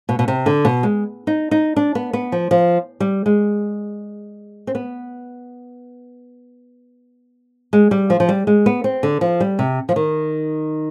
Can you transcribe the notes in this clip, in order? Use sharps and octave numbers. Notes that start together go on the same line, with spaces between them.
B2
B2
C3
D3
B2
G#3
D#4
D#4
D4
B3
B3
F3
F3
G3
G#3
C4
B3
G#3
G3
F3
F3
G3
G#3
B3
C4
D3
F3
G3
C3
F3
D#3